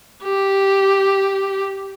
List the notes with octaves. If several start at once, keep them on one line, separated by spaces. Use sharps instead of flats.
G4